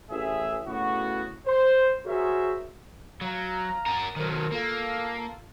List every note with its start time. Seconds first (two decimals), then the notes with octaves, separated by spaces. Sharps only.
0.10 A1 G#4 E5
0.67 A2 C#3 B3 F#4
1.47 C5
2.06 F#4 G#4 A#4 C5 C#5 E5
3.21 F#3 F5 A#5
3.86 F#4 A#4
4.16 D#3 F#3 A4 A#4 C5
4.52 A#3 F4 A4